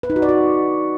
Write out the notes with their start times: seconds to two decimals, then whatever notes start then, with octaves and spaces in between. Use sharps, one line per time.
0.03 B4
0.10 D#4
0.16 F#4
0.22 D5
0.29 F#4